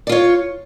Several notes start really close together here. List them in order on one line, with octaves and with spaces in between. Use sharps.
D5 F4 C#5